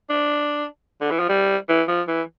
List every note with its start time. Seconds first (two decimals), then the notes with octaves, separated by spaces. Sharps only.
0.10 D4
1.01 D3
1.11 E3
1.20 F3
1.29 G3
1.69 E3
1.88 F3
2.08 E3